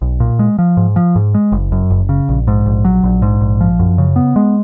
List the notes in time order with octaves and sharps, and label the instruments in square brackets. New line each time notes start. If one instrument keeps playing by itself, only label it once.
[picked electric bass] B1
A#2
G#3
F3
G#2
F3
G#2
G#3
F#1
F#2
F#1
C#3
A#1
G#2
A#1
F#3
A#1
G#2
A#1
F3
F#2
C#3
B3
G#3